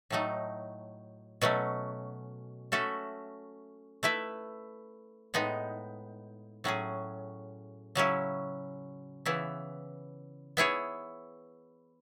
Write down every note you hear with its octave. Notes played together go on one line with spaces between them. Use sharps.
A2 F#3 A3 D#4
B2 F#3 A3 C#4
A3 C#4 F#4 A4 E5
A3 E4 B4 E5
A2 G#3 B3 D#4
A2 F#3 C#4 G#4
C#3 F#3 C#4 E4
C#3 E3 B3 E4
B3 E4 G#4 C#5